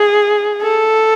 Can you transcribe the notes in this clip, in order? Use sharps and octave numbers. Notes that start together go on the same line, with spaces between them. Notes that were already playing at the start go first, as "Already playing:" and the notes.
Already playing: G#4
A4